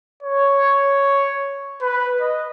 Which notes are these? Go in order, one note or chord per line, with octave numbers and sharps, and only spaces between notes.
C#5
B4
D#5